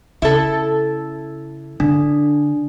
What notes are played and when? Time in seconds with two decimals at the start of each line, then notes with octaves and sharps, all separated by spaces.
0.22 C#3 E4 A4
1.80 D3 D4